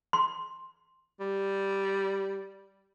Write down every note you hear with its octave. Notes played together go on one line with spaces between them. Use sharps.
C6
G3